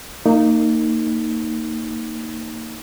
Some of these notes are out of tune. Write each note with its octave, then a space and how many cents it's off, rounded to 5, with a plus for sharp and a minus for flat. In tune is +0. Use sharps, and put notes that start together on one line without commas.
A#3 -25 D#4 +0